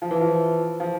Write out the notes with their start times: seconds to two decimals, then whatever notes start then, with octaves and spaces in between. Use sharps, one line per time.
0.02 F3
0.11 E3
0.21 F3
0.80 F3